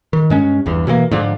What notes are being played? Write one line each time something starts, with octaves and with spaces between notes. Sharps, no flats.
D#3
G2 G#3 C#4
G1 E2
B2 E3 F#3 A#3
G#2 D3 F3